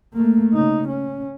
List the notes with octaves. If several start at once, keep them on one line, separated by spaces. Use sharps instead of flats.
A3 A#3
C#3 D#4
C#4